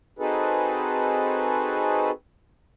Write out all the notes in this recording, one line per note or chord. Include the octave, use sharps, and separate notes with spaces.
C4 D#4 F#4 G#4 A4 B4